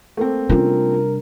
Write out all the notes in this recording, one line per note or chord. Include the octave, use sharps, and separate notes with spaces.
A3 A#3 C4
C3 G3 C#4 D4 F4 A#4